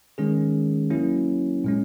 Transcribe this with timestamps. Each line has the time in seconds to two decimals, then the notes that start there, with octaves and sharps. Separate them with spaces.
0.18 D#3 G#3 C#4 G#4
0.90 F#3 A#3 C#4 E4
1.64 A#2 G#3 C#4